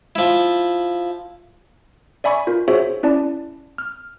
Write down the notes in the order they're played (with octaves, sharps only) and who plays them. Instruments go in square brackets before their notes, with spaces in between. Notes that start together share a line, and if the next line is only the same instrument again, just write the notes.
[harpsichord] F3 E4
[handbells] D5 E5 G#5 B5 C#6
F4 A#4
F#4 G#4 C5 C#5 E5
C#4 E4 D5 A5
F6